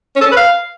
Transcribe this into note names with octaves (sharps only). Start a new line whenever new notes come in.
C#4
A4
C#4
B4
F5